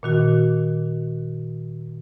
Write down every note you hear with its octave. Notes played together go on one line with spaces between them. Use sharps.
A#2 D#3 F#4